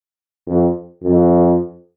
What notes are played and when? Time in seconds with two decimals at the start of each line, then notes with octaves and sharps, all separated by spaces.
0.47 F2
1.03 F2